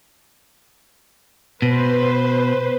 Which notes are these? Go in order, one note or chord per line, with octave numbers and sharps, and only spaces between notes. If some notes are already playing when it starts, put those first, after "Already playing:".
B2 B4 C5